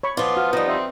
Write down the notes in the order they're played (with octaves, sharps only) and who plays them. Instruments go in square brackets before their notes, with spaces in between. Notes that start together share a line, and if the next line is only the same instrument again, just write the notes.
[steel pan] C#5 B5 C#6
[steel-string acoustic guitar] F3 F4 [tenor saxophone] B3 [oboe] D5
[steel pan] F#4 [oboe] F5
[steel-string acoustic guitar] F3 G3 [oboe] D#4 [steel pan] B4 D#5
[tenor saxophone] C4 [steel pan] E5